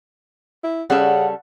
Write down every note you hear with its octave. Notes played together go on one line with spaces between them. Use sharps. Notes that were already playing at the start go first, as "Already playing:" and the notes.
E4
C#3 G3 C#4 A4 F#5